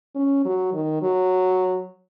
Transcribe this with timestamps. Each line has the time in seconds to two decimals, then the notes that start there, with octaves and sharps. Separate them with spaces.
0.15 C#4
0.45 F#3
0.73 D#3
1.02 F#3